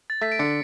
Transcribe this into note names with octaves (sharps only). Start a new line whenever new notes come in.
A6
A3 B6
D7
D3 C#7